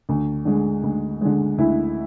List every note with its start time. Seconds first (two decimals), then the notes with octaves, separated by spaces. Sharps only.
0.09 D2
0.45 D3 G#3
0.83 D2
1.21 D3 G#3
1.58 D2 E4